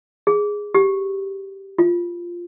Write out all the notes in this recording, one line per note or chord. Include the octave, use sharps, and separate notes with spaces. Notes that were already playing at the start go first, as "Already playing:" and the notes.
G#4
G4
F4